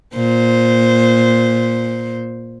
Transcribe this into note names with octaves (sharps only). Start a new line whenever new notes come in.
A#2 C5